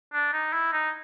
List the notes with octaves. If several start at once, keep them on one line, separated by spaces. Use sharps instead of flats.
D4
D#4
E4
D#4